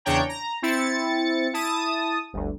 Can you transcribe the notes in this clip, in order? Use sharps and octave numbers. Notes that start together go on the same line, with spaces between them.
E2 C#3 D4 C#5 G5 A#5
A#5
C4 E4 A6 C#7
E4 A5 D#6
G1 D2